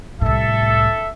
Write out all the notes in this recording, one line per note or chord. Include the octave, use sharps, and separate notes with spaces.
C2 A2 A4 E5